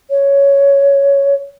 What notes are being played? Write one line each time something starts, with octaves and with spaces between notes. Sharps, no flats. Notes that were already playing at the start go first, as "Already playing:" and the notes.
C#5